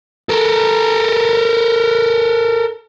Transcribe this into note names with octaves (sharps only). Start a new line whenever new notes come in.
A4 A#4